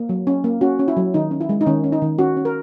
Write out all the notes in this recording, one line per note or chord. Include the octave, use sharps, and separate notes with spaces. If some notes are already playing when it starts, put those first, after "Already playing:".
Already playing: A#3
F#3
C#4
A#3
C#4 F#4
C#4
E4
F#3
D#3 D#4
C#4
E4
G#3
D#4
D#3 C#4
C#4
D#4
D#3
C#4 F#4
C#4
A#4